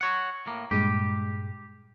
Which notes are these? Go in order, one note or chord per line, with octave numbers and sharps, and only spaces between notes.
F#4 C#5 F#5
A2 A#3
G2 A#2 G#3 G4